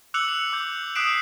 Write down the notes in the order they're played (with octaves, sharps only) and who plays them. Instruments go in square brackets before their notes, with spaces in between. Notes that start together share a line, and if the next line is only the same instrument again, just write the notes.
[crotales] D6 E6 F#6 C#7 F7 F#7
F7
D6 G6
D#6 F#6 B6 C7 D7 E7